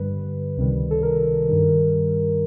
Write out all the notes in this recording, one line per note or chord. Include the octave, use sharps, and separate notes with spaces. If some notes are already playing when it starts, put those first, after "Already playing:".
Already playing: G2 D3 G3 B4
C#2 C3 D#3 G3
A4
A#4
G2 D#3 G3